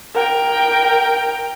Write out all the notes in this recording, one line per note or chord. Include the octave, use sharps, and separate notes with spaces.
A#4 G5